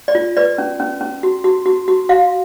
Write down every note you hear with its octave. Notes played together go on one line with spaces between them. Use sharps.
D5
F4
B4 D5
C#4
C#4
C#4
F#4
F#4
F#4
F#4
F#4 F5